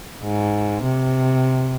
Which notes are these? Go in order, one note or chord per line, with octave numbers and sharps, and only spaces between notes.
G#2
C3